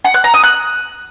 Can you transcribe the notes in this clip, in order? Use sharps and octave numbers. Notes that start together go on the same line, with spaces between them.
F#5
F#6
A#5
D#6
F#6